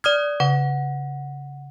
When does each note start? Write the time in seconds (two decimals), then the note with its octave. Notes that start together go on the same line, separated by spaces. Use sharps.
0.04 D5 D#6 F6 G#6
0.40 C#3 F#5